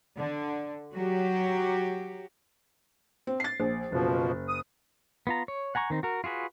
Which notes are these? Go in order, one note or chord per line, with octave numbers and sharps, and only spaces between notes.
D3
F#3 F#4 G4
C4
A6 C7
A#1
F#1 B2 F3
D#6
B3 F4 A#5
C#5
F#5 G#5 A#5 C#6
D#3 C4 D#4
F#4 A#4
F4 F#4 G#4 B4